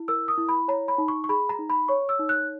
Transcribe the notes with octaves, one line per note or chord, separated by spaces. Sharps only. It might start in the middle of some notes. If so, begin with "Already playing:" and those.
Already playing: E4
A#4 E6
D#6
E4
B5
C#5 A#5
B5
D#4
C#6
C#6
G#4 B5
A#5
D#4
B5
C#5 C#6
E6
D#4
F#6